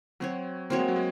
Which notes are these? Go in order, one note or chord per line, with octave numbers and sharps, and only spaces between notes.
F#3 C4 F#4 C#5
A#3 C4 F#4 C#5
G#3
F#3
G#3